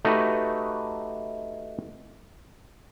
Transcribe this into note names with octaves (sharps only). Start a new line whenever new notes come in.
A3 D#4 F#4 G4 B4